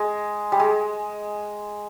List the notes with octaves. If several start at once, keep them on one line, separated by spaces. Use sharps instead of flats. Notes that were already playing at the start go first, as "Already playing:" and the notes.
Already playing: G#3
G3
G#3